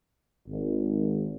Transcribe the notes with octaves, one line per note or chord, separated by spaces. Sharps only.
G#1